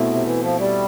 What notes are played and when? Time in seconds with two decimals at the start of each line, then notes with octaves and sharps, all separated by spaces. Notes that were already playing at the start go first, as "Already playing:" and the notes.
Already playing: B2 A3 C4 E4
0.10 C3
0.26 E3
0.42 F3
0.59 G3